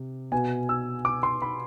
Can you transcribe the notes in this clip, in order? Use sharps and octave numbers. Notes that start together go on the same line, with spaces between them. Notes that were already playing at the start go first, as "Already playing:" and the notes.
Already playing: C3
B2 G#5
E6
D6
C6
B5